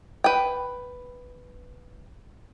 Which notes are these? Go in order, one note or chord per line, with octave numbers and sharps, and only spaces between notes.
B4 G5